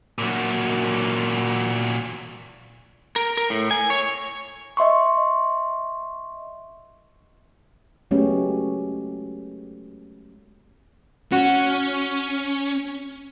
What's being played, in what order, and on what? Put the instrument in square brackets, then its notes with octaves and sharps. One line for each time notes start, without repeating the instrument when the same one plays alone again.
[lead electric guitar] A#2 F#3
A#4
A#4
A2
G#5
C#5
[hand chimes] D#5 E5 C6 C#6
[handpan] F#3 G#3 A3 B3 C#4 G4
[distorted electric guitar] C#4 [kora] F#4